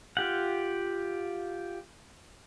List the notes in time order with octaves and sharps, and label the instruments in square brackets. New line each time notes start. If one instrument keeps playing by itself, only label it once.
[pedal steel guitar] F4 G4 F#5